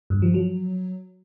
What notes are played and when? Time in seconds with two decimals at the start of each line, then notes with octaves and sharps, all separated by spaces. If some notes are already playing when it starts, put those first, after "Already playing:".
0.10 G2
0.22 F3
0.34 F#3